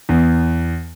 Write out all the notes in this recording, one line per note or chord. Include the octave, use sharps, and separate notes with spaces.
E2